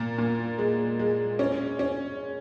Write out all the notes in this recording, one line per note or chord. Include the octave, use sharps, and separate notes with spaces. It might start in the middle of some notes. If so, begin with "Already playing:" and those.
Already playing: A#2
A#2
G#3
G#3
C#4
C#4